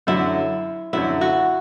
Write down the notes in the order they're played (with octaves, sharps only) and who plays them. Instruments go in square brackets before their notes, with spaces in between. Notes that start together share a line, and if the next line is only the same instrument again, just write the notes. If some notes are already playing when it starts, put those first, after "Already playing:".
[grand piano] F#2 D3 F#3 [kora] E4
[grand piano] F#2 D3 F#3 [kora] E4
[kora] F#4